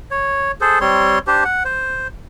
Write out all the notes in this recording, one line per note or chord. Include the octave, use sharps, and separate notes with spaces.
C#5
G#4 A4 C5
G3 C4 C#5 C6
D4 G4 C5
F#5
C5